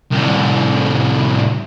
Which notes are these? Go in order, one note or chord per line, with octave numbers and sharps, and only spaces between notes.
C2 A2